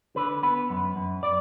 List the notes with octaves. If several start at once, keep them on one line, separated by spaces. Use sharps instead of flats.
D3 B4
B3 B4
F#2
F#2
D5